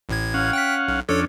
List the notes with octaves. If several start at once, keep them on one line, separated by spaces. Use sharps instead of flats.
A1 A2 G#6
C#4 F5 F#5
G5 F#6 B6
B1
F2 C#4 D4 A4 C#5